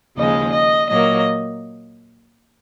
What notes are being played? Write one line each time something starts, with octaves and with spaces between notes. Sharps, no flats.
D#2 C#3 F3 G#3 D#5
D#5
A#2 F#3 A#3 D#5